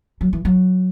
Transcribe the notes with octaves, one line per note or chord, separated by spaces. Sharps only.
F#3
E3
F#3